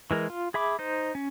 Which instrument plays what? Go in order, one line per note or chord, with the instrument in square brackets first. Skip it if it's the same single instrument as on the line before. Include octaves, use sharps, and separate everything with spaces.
[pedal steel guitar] E3 G#3 A#4
F4
G#4 E5 B5 D6
D#4 C5
C#4